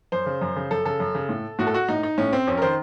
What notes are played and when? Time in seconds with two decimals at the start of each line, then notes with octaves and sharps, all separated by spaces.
0.12 F#2 C5
0.26 C#3
0.41 F#2
0.56 C#3
0.71 F#2 A4
0.85 C#3 A4
1.00 F#2
1.15 C#3
1.29 A2
1.59 A2 F#4
1.67 A4
1.74 F#4
1.88 A2 D#4
2.03 D#4
2.18 A2 C#4
2.33 C4
2.47 F2 C#4
2.57 A#4
2.62 D#3 C5